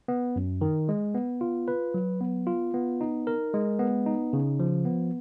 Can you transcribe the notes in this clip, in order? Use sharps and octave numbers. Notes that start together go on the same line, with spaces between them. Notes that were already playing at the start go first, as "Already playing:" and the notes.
B3
F#2
D#3
G#3
B3
F4
B4
F#3
B3
F4
B3
D#4
A#4
G#3
B3
D#4
C#3
F3
B3